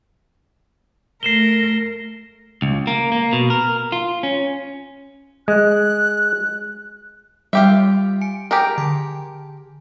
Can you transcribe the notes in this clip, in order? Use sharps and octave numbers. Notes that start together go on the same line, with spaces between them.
A3 A#4 C7 E7 G7
C#2
A#3
A#3
B2
A#4
F4
C#4
G#3 F#6
G3 F4 G4 E5
G#5 C#7 D7
G4 G#4 A#4
D3 A5